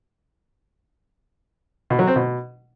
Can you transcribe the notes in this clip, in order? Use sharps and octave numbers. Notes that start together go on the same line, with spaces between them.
B2
F#3
C4
B2